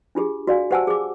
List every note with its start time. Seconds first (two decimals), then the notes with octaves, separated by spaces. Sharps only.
0.15 D4 F4 G4 G#4
0.47 F#4 D5 F5 G#5
0.71 G4 C5 F#5 G#5 A5 E6
0.87 G#4 D6